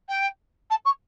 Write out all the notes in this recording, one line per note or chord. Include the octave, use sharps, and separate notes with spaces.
G5
A5
C#6